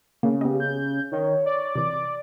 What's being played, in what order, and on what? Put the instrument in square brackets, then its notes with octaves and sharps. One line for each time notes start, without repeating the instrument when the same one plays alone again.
[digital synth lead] C#3 [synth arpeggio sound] A#3
[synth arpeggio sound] B3 D#5 [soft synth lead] G4
[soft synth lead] G6
[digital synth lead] D#3 [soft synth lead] C#5
[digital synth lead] D5
[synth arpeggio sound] C3 E3 [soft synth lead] D6